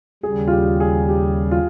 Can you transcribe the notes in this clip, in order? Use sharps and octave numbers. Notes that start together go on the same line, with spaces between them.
D#2 C#3 G3 G#4
F4
G4
G#4
G4
F4